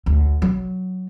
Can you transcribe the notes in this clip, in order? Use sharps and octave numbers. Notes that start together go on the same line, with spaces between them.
D2
F#3